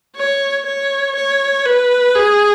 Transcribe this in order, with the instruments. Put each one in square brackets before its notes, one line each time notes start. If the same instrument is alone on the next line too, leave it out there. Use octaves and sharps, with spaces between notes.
[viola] C#5
C#5
C#5
B4
G#4